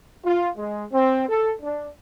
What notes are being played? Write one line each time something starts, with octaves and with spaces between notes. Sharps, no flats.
F4
G#3
C4
A4
D4